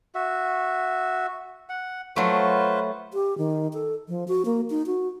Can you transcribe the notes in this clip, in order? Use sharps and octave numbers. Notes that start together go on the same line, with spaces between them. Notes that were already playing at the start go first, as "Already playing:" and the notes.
F#4 E5
F#5
F#3 A3 F4 B4 C5
G4
D#3
A4
F3
F#4
A#3
D#4
F#4